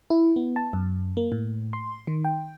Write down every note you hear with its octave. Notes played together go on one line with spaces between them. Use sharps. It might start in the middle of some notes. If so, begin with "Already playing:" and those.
E4
B3
A5
F#2
A#3
A2
C6
D#3
G5